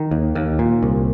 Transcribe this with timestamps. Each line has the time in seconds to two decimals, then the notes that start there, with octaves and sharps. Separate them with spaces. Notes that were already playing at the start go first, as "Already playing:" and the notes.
Already playing: D#3
0.11 D#2
0.35 D#2
0.59 A#2
0.83 C2